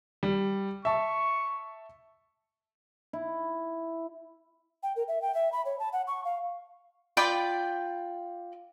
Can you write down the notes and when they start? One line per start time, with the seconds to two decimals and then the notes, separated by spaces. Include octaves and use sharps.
0.23 G3
0.85 E5 A5 C#6
3.13 E4
4.83 G5
4.96 A#4
5.08 E5
5.22 G5
5.34 E5
5.52 B5
5.65 C#5
5.79 A5
5.93 F#5
6.07 C#6
6.25 F5
7.17 F4 D5 G5 B5